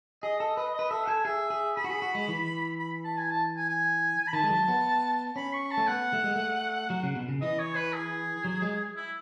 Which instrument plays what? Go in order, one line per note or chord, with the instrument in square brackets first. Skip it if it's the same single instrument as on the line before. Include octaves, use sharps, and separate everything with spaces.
[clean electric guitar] G#4 [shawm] D#5
[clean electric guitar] A4 [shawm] D#5
[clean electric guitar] B4 [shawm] D#5
[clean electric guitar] B4 [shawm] D#5
[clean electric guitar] A4 [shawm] E5
[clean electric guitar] A4 [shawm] G#5
[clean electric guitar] G#4 [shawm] E5
[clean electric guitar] G#4
[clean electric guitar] G#4 [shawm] B5
[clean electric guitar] F#4
G#4
F#4
G#3
E3
[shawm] B5
A5
G#5
A5
G#5
G#5
B5
[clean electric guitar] D#3 [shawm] A5
[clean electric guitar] G#3
F#3
B3
[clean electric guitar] C#4 [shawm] B5
[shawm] C#6
A5
[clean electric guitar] A3
[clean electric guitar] B3 [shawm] F#5
[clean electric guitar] A3
G#3
A3
F#3
C#3
B2
C#3
[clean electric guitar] E3 [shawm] D#5
[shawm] C#5
B4
G#4
[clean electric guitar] F#3
G#3
[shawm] E4